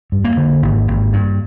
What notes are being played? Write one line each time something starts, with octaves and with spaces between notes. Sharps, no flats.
G2
A#3
D3
G#1
G#1
G2